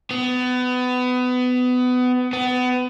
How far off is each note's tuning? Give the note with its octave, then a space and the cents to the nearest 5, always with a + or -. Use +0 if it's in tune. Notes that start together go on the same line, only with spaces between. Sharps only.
B3 +25
B3 +25